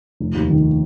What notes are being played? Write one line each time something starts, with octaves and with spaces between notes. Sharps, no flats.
F1
D#2
D#3